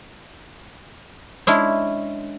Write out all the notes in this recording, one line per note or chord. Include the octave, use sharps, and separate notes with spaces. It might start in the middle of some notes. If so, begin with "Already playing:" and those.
G#3 C#4 D4 E4